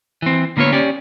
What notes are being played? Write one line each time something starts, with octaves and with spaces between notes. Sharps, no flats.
E3 C4
D3 A#3 B3 F4 C#5
C#4 G4 D5